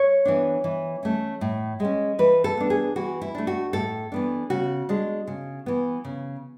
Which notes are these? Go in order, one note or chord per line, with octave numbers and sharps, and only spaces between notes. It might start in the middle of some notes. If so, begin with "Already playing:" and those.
Already playing: C#5
E3 B3 D4
E3
A3 C#4
A2
G#3 C#4
E3 B4
A4
B3 D4
G#4
E3 F#4
E4
A3 D4
F#4
A2 A4
E3 B3 D4
C#3 F#4
G#3 D4
C#3
E3 B3
C#3